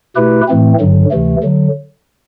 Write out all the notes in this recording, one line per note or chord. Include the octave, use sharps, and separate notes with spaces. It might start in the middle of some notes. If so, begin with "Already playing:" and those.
B2 A3 E4 G4 B4
A2 E3 A3 C4
G2 D3 F#3
D2 C3 E3 A3
D3 F#3